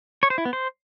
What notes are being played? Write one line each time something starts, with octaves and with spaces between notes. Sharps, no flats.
C#5
C5
E4
B3
C5